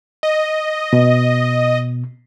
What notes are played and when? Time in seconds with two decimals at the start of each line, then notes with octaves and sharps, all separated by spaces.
0.23 D#5
0.93 B2